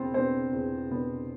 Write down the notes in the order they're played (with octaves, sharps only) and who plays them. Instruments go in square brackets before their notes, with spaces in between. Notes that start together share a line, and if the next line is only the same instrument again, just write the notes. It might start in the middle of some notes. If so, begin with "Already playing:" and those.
Already playing: [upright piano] E2 B2 B3 C4 D4 C5
B2 B3 C4 D4 C5
E2
B2 B3 D4